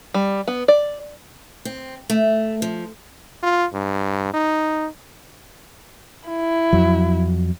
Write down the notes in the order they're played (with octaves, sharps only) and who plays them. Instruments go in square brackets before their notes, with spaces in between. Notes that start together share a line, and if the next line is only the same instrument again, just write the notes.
[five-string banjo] G3
B3
D5
[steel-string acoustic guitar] C4
A3
F3
[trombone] F4
G2
D#4
[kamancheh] E4
[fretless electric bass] F2 F#3